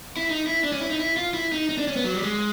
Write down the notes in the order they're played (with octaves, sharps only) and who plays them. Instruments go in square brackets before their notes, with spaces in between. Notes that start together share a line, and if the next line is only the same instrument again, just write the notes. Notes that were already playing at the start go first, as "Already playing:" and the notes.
[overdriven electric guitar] E4
D#4
E4
D4
C#4
E4
D#4
E4
F4
E4
D#4
D#4
D4
C#4
B3
F#3
G3
G#3